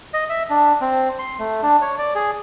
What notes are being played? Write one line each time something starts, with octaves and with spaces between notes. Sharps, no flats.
D#5
E5
D4
C4
C6
A3
D4
C#5
D5
G#4